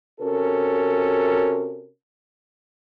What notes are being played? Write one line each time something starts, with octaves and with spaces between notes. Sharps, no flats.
C3 C#4 F#4 A4 A#4